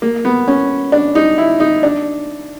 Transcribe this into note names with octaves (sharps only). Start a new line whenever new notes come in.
A#3
B3
C#4
D4
D#4
E4
D#4
D4